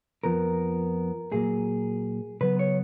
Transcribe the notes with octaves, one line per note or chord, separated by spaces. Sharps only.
F2 F3 B3 A#4
A#2 F#3 A#3 G#4
C#3 F#3 B3 B4
C#5